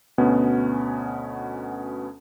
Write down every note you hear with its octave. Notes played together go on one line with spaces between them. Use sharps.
D2 B2 B3 C#4